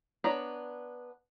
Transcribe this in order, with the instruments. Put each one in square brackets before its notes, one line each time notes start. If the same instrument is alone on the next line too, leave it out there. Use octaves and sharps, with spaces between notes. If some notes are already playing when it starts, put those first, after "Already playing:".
[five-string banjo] B3 D4 C#5 A#5 B5